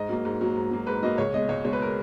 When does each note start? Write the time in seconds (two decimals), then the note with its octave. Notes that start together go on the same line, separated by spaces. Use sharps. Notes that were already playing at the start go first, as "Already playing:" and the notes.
Already playing: G#2 D#5
0.09 F#3 A#3
0.25 G#2
0.41 F#3 A#3
0.56 G#2
0.71 F#3 A#3
0.87 G#2 B4
1.03 F#3 A#3 D#5
1.18 C#2 C#5
1.33 B2 G#3 D#5
1.49 C#2 C#5
1.65 B2 G#3 C#5
1.73 B4
1.82 A#4